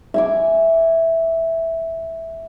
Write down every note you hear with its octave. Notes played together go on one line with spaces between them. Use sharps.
E5 G#5 D6